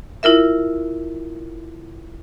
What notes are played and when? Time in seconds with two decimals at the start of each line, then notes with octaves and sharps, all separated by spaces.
0.23 E4 F4 A#4 E5